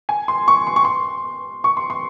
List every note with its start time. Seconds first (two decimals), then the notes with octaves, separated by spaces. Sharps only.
0.09 G#5
0.28 C6
0.48 C#6
0.67 C6
0.76 C#6
0.85 C6
1.64 C#6
1.77 C6
1.90 C6